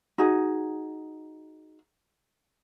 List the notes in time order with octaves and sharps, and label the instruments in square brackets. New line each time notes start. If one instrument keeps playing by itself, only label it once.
[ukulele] D#4 F#4 G#4